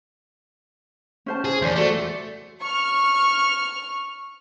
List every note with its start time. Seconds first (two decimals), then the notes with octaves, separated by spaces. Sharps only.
1.26 C#4 C5 A5
1.44 G#4
1.62 E2 C5 D5
1.76 A3 F#4 A4 D5
2.61 C#6 F6